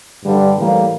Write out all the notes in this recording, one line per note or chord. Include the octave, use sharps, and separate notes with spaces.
G2 D3 G3
A2 E3 G3 A#3